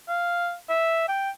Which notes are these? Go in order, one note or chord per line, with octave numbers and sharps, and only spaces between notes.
F5
E5
G5